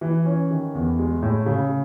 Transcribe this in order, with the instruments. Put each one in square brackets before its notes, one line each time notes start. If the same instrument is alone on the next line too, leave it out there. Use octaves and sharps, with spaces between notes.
[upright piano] E3
C#4
D#3
E2
G#3
A2
C#3